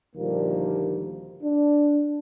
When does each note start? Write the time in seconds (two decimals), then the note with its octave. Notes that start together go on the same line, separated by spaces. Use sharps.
0.16 D2 A#2 D#3 F3 G3 A#3
1.43 D4